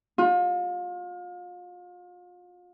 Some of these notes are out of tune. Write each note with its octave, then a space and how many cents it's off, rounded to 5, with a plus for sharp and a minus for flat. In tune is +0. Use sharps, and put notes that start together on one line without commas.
F4 +35